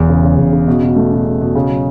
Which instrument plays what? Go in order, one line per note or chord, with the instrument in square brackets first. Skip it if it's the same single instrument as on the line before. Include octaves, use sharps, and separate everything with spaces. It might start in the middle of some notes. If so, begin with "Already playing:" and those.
Already playing: [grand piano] E1 E2
C#3
C#3
E1
C#3
B2
B2
A3
B2
B2
B2
C#3
F#3